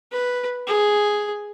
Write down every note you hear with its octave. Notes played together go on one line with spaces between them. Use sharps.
B4
G#4